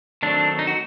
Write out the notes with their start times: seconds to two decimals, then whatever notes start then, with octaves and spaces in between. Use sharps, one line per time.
0.23 D#3 F#3 A3 C4 D4
0.59 D#4
0.67 F#4